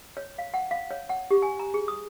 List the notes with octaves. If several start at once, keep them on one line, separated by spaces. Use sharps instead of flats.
C#5
F5
F#5
F5
C#5
F#5
G4
G#5
A#5
G#4
D#6